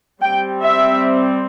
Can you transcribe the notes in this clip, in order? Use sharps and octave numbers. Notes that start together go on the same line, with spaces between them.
G3 C4 G5
E5